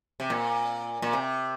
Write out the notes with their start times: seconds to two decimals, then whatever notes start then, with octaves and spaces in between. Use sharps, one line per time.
0.20 C3
0.30 A#2
1.02 A#2
1.13 C3